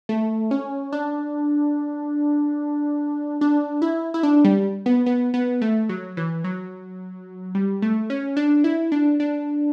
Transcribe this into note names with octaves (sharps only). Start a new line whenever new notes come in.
A3
C#4
D4
D4
E4
E4
D4
G3
B3
B3
B3
A3
F#3
E3
F#3
G3
A3
C#4
D4
E4
D4
D4